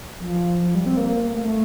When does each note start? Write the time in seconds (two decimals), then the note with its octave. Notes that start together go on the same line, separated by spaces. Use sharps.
0.20 F3
0.64 F3
0.75 G3
0.86 C4
0.97 A#3
1.08 A#3
1.29 A3
1.41 A3